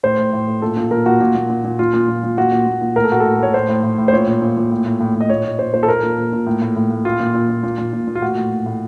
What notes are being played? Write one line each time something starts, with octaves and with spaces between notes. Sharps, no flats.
A2 C5
A2
A2
A2
A#2 A4
A#2
A#2 A#4
A#2 F#4
A#2
A#2
A#2
A#2
A#2 F4
A#2
A#2
A#2
A#2 F#4
A#2
A#2
A#2
A2 A#4
A4
A2 F#4
A4
A2
A2 C#5
A2 C5
A2
A2
A2
C5
A#2 C#5
A#2
A#2
A#2
A2
A2
A2
A2
D#5
A#2 C#5
A#2
A#2 C5
A#2 C5
A4
A#2 A#4
A#2
A#2
A#2
A2
A2
A2
A2
A#2 F4
A#2
A#2
A#2
A#2
A#2
A#2
A#2
F4
A2 F#4
A2
A2
A2